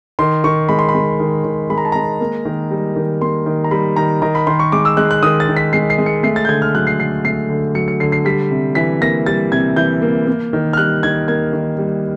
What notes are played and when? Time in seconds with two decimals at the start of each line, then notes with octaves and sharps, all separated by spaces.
0.19 D#3 C6
0.44 D#3 C#6
0.69 G#3 B5
0.79 C6
0.89 B5
0.94 G#3
1.20 D#3
1.45 D#3
1.70 G#3 B5
1.78 A#5
1.85 A5
1.92 G#3 A#5
2.20 A#3
2.45 D#3
2.71 G3
2.96 D#3
3.21 A#3 C6
3.46 D#3
3.64 A#5
3.71 G3 B5
3.96 D#3 A#5
4.22 D#3 A#5
4.35 B5
4.47 D#3 C6
4.59 C#6
4.72 G#3 D6
4.85 E6
4.97 G#3 F#6
5.11 F#6
5.23 D#3 D#6
5.40 A6
5.48 D#3
5.57 B6
5.73 G#3 C7
5.90 C7
5.98 G#3
6.06 C#7
6.23 A3 C7
6.36 A6
6.45 G6
6.49 D3 G#6
6.62 F6
6.75 F#3 F#6
6.87 C7
6.99 D3 C7
7.24 A3 C7
7.50 D3
7.75 F#3 C#7
7.88 C#7
8.00 D3 C7
8.12 C7
8.25 G3 B6
8.51 C3
8.75 E3 B6
9.01 A#3 A#6
9.26 G3 A6
9.52 C3 G#6
9.76 E3 G6
10.02 A#3
10.27 A#3
10.53 D#3
10.73 F6
10.77 G3 F#6
11.03 D#3 G#6
11.28 A#3 G#6
11.53 D#3
11.78 G3